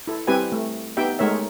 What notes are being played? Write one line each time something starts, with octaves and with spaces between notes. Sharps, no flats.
E4 A4
G3 C4 E4 G4 B4 G#5
A3
B3 D#4 G4 E5 G5
G#3 A3 D#4 A#4 C#5 E5